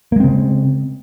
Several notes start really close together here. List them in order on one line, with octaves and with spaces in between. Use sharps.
A#3 G#3 C4 C#3